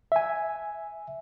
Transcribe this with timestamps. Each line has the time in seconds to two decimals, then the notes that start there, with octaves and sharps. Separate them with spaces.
0.12 E5 G#5